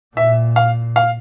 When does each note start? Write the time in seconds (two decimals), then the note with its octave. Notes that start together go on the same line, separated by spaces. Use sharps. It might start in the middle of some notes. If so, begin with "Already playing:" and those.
0.16 A#2 E5
0.56 F5
0.96 F5